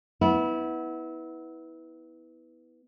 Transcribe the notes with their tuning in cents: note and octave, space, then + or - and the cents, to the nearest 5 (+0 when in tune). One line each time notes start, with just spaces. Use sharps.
B3 +0 E4 -25